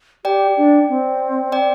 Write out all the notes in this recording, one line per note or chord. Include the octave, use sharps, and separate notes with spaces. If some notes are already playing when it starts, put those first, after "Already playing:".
G4 D5 G5
D4
C4
D5 G5